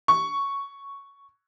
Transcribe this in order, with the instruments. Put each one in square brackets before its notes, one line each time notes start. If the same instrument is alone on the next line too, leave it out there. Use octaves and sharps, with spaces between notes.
[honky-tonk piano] C#6